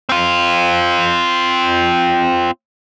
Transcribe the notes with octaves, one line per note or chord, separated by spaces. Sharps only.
C4 F4